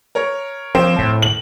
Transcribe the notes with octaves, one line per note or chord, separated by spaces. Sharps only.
A#4 C#5 A#5
F3 C4
A2
F#7